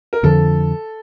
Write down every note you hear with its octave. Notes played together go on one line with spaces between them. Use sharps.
A#4
F2 D3 F3 A4